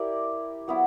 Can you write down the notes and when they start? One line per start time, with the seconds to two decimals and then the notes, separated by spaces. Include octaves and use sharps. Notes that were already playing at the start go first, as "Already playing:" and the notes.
Already playing: E4 G4 A#4 D5
0.68 F#3 B3 E4